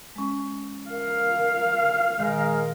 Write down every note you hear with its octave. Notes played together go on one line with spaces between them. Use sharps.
G#3 C#4
A#4 F5
A#2 D#3 G#3 G#4 A#4